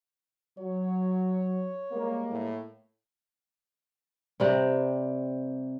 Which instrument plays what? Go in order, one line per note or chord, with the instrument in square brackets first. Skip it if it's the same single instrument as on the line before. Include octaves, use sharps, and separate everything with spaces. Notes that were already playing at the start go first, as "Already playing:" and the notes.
[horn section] F#3 [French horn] C#5
[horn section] G3 G#3 A#3
[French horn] A2
[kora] C3 G3 C4